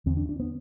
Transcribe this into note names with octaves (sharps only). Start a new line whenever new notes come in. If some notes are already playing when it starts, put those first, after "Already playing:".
E2 D3 C4
D4
D4
B3